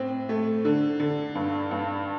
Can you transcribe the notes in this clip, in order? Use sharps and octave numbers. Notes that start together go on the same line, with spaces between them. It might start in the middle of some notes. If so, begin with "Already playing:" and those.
Already playing: A2 C4
A3
D3
D3
G2
G2